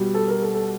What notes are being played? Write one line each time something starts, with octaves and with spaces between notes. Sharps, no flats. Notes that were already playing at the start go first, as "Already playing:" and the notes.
Already playing: B2 G3
A4
A#4
A4
A4